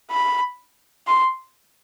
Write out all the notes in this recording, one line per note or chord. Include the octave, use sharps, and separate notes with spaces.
B5
C6